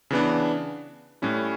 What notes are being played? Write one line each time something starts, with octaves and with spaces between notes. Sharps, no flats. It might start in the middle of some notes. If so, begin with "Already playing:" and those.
C#3 E3 B3 D4
A2 G3 C#4 E4